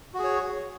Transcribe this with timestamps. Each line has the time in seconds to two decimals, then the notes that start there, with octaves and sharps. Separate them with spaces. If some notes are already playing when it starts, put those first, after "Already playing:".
0.14 F#4
0.19 G#4
0.24 C#5